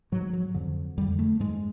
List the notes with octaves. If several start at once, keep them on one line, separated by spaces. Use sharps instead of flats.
G#2 F#3
F#3
F2 D3
F2 D3 G3
A3
G#2 G#3